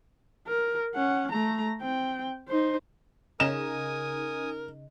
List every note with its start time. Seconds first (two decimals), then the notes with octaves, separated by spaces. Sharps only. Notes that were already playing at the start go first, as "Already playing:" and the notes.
0.47 A#4
0.94 C#4 F#5
1.32 A3 A#5
1.81 C4 G5
2.48 D#4 C5
3.40 C#3 D#4 A#4 G#5 D#6 E7